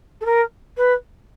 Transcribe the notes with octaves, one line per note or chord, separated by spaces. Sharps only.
A4
A#4
B4